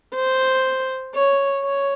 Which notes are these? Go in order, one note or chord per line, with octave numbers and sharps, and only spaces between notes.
C5
C#5
C#5